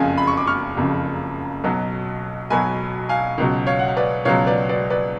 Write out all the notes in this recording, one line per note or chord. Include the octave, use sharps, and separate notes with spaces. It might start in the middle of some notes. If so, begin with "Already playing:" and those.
Already playing: F#1 F2 C#3 F5 G#5
B5
C#6
D6
C#6 F6
F#1 F2 C#3
B1 B2 F#3
B1 B2 F#3 G#5 B5
F5 G#5
C#2 B2 F#3
C#5 F5
F#5
F5
B4 D5
C#2 B2 F#3 C#5 F5
B4 D5
B4 D5
B4 D5